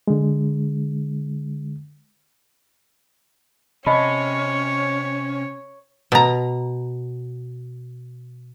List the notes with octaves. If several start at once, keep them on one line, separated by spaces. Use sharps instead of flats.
D3 G#3
C3 C#4 C#5 D#5 A5 B5
B2 A#5